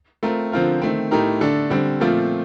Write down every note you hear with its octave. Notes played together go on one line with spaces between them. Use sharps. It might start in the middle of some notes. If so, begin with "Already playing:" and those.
A3 C4 F4 A#4
D3 F3 C4 F4 A#4
D#3 A3 C4
A2 A3 D#4 G4 A#4
D3 A3 D4 A4
D3 G3 C4
A#2 F3 A3 C4 F4